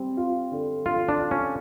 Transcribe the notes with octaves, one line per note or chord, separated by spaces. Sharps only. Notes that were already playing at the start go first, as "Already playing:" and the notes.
Already playing: G3 C4
F4
D3
D3 F4
D4
F4
C#4